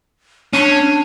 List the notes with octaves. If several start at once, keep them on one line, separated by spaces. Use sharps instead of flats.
C#4 D4